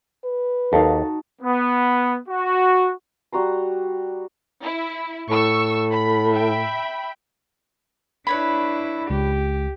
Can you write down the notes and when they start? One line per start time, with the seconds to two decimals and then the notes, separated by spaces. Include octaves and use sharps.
0.24 B4
0.73 D#2 D#4 F#4 A4 F5 A5
1.41 B3
2.29 F#4
3.32 G3 F#4 A#5 C6
4.62 E4
5.30 A2 C#6 E6
5.91 B5
6.33 E5 G5 B5
8.27 D4 E4 B4 C#5 B5
9.10 C#2 G4